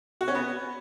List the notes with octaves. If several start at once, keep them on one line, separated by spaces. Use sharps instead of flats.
F#4
C#4
B3